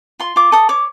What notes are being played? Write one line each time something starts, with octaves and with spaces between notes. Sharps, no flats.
F4 C6
F4 D6
A4 D#6
C#5 D6